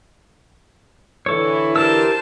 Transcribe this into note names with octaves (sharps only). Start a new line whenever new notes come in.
D3 E3 E4 A4 C#5
G4 A#4 C5 A5 E6